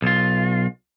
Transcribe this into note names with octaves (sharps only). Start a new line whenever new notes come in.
B1 F4